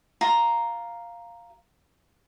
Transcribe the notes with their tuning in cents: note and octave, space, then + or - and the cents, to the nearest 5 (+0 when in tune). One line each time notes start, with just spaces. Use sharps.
F4 +0 A#5 +0